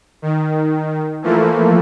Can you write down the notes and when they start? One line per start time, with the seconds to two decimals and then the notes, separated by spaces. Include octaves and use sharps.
0.22 D#3
1.22 E3 F3 A3 A#3